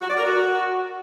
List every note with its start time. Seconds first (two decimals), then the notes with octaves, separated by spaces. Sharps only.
0.01 F#4
0.09 D5
0.17 A#4
0.25 F#4